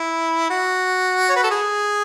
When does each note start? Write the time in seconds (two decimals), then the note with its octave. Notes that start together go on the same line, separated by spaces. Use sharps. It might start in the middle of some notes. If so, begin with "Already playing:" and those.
Already playing: E4
0.50 F#4
1.29 C#5
1.36 B4
1.44 A4
1.51 G#4